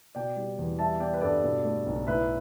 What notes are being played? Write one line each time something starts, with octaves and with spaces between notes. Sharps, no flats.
B2 D5 G5
G3
E2
G3 E5 A5
B3 D5 G5
B4
G2 A4 D5
B2
A3
B1
A2 B4 E5